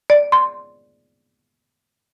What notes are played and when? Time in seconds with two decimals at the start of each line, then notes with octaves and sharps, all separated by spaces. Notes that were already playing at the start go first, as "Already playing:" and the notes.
0.10 D5
0.32 C6